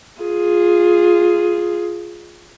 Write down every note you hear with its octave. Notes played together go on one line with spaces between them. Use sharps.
F4 G#4